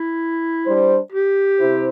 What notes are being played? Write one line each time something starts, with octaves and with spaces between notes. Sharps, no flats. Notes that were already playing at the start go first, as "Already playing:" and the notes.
Already playing: E4
G3 D4 C5
G4
C3 E4 C5